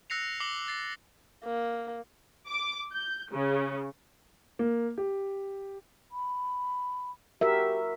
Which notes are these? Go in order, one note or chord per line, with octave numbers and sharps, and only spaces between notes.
E6 F#6 A#6 C7 C#7 F7
D6 C7 F#7 G7
A6 C7
A#3
D6
G6
C#3
A#3
G4
B5
F#4 G4 A#4 E5